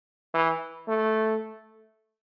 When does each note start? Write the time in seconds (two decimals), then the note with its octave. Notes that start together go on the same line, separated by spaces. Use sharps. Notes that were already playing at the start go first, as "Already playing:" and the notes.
0.34 E3
0.88 A3